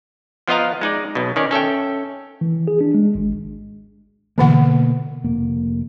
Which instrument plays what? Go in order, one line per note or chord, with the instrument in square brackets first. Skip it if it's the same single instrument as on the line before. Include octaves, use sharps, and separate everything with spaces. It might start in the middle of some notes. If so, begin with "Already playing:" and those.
[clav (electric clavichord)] F3 B3 F4 D#5 F5 A#5
G#3 D#4 D5
B1 B2
D#3 C#4 D5
C#4 A4 E5 G5
[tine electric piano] E3
G#4
D4
G#3
G#1
[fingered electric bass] B2 A#3 [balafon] D3 E3 F#5
[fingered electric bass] F1 A#3